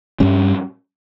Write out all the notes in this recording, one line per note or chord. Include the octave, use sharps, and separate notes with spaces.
G2 G3 C#4